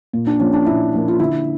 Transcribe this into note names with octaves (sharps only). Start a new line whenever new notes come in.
A#2
D4
F3 A#3 C#4
D4
A#2 E4
F3 A#3
F4
D3 E4